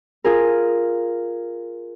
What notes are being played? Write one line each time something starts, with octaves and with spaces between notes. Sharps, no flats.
F4 G#4 A#4